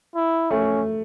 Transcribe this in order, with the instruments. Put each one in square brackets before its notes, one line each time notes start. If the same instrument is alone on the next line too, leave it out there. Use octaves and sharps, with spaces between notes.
[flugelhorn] E4
[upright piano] A3 [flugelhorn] C#4